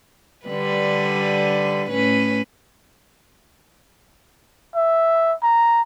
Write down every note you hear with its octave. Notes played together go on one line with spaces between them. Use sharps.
D3 G3 B4
A2 C#4 B4
E5
A#5